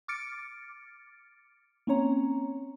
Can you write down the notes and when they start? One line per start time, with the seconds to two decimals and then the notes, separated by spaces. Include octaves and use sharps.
0.08 D6 F6 A6 C#7 D7
1.87 A#3 C4 C#4 C#5 A#5